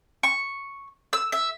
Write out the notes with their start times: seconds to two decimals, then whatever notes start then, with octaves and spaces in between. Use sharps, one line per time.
0.23 C#6
1.13 E6
1.32 E5